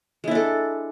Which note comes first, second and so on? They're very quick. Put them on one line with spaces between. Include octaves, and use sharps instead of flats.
G#3 E4 D4 A4